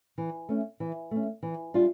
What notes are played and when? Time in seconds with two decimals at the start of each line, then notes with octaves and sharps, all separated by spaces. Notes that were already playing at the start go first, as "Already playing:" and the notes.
0.18 E3
0.49 A3 C#4
0.80 E3
1.11 A3 C#4
1.43 E3
1.74 G3 D4 F4